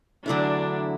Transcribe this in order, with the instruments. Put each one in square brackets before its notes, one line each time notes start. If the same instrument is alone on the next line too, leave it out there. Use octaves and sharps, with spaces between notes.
[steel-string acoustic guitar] E2 D3 F#3 A3 E4 [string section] D4